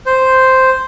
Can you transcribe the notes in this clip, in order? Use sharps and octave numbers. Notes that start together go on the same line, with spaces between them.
C5